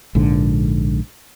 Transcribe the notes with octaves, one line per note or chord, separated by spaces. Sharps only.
A#1 G#2 D3